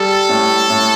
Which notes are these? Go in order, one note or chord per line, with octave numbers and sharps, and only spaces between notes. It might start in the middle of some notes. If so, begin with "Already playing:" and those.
Already playing: G3 A4
A2
A2